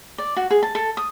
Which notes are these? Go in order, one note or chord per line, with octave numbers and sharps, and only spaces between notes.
D5
F#4
G#4
A5
A4
D#6